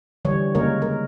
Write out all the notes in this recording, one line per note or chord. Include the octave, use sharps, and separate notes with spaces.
D3 E3 G3 C#5
C#3 G#3 A#3 A#4 C#5
A#4